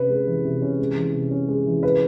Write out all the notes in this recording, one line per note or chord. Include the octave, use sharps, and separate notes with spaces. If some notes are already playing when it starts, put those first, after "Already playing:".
Already playing: C3 C#4 B4
G#3
E3
C3
C#4
G#3
E3
C3
C#4
G#3
E3
B4